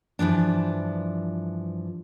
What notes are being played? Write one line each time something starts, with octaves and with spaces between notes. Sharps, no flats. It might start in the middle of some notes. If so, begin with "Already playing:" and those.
G2 E3 F3 D4